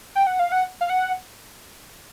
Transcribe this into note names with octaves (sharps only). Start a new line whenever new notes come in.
G5
F#5
F5
F#5
F5
F#5